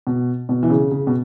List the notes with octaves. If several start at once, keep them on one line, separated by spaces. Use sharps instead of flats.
B2
B2
E3
C#3
C#3
B2